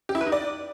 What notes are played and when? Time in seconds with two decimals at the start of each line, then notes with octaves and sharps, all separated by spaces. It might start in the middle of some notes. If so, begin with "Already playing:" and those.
0.09 G4
0.15 E4
0.21 B4
0.27 D#4
0.32 D5